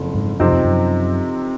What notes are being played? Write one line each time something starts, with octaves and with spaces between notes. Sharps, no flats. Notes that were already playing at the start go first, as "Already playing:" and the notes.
Already playing: F#1 F2
G#2
F#2 C3 F3 C4 D#4
F2
F#2